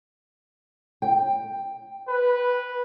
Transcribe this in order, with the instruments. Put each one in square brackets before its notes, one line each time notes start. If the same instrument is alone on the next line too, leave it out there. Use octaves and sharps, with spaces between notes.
[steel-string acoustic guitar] G5
[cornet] B4